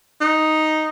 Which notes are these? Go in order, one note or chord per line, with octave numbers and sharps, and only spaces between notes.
D#4